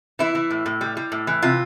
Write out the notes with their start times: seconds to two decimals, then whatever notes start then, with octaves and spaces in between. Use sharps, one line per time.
0.19 E3 E4
0.35 E3
0.50 A2
0.66 A2
0.81 G3
0.97 G3
1.12 A2
1.27 E3
1.42 C3 F4